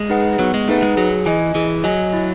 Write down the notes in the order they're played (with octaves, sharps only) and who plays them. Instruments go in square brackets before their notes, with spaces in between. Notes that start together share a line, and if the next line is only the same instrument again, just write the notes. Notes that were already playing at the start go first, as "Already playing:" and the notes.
Already playing: [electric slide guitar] G#3
[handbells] D#4 G#4 B4 F#5
[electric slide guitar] F#3 [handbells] B3
[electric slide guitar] G#3
[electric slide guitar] A3 [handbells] D#4 G#4 B4 F#5
[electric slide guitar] G#3
[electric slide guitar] F#3 [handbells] G#4
[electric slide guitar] E3 [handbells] D#5 G#5
[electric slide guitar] E3 [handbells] G#4
[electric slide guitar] F#3 [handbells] D#5 G#5
[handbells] E4